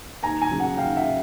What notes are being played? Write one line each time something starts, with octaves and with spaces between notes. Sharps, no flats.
D#2 G#5 A#5
G#5 A#5
C#3 F#3
F#5 G#5
D#2 F5 G5
E5 F#5
C#3